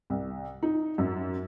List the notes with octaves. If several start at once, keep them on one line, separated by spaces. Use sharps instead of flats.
C2
D#4
F#2